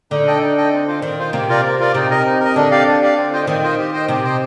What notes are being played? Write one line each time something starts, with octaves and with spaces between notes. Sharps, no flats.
D3 D#4
A4 D#5 G5
D#4
A4 D#5 G5
C4
F4 C5
D#3 C4
F4 C5
C3 A#3
F4 A#4 D5
A#3
F4 A#4 D5
C3 D#4
A#4 D#5
D#4
A#4 D#5
D3 D4
G4 D5 F5
D4
G4 D5 F5
C4
F4 C5 D#5 G5
D#3 C4
F4 C5 D#5 G5
G4
C5 D#5 G5
C3 G4
C5 D#5 G5